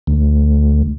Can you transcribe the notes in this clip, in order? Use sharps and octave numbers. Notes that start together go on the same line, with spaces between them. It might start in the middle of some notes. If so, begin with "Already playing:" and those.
D2